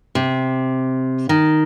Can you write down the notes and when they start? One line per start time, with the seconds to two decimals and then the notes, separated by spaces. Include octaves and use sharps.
0.15 C3
1.29 D#3